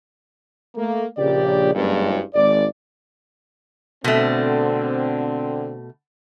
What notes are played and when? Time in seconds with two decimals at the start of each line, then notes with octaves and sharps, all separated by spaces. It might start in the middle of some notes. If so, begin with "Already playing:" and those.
0.75 A3 A#3
1.17 A#1 C#3 G4 D5
1.74 F#1 G2 G#3
2.34 G#1 D5
4.04 B2 D3 A3 C4